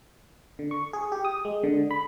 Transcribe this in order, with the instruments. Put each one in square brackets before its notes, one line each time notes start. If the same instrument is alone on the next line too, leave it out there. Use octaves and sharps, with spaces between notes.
[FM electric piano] D3
C#6
G#4
G4
D#6
G#3
D3
B5